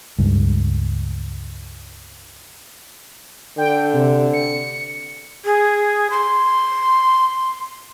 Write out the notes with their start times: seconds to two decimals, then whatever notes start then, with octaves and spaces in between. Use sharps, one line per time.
0.19 C#2 G2
3.58 D3 G5
3.94 C3
4.33 C#7
5.45 G#4
6.10 C6